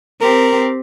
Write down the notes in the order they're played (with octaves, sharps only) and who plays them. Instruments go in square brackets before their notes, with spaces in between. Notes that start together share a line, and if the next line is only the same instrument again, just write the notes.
[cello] C4 G4 [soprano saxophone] A#4